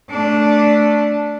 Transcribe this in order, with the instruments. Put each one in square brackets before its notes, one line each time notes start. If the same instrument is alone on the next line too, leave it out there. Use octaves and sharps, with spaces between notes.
[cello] A3 D4